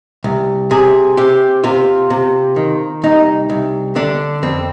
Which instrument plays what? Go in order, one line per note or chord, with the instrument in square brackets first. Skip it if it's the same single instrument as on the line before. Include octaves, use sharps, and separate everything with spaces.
[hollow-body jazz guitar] C2
C3 G#4
C3 G4
C3 F4
C3
D#3
C2 D#4
C2
D3 D4
F2 C4